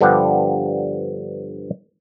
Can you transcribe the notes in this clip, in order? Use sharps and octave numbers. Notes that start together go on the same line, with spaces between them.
G2 D3 F3 B3 G4 F#5